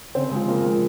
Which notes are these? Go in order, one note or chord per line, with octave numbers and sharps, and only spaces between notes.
C#3 C4 C5
F3 G#3
C#3 A#3 A#4
F3 G#3